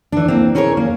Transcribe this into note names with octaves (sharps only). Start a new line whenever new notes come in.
E3 D4
A#3 C4
C#4 G#4 A#4 C5 C#5
A#3